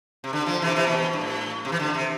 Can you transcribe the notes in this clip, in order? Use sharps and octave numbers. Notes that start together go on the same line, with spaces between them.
C3
D3
D3 F3
C3 E3
C3 E3
B2
B2
G2
A2
C3
E3
D3
C3